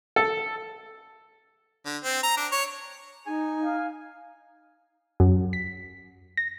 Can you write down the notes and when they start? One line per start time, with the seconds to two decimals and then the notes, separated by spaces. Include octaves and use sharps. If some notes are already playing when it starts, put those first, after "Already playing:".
0.16 A4
1.85 D3
2.04 C4
2.23 A#5
2.37 D4
2.52 C#5
3.26 D#4 G#5
3.63 F5
5.20 F#2
5.53 B6
6.37 A#6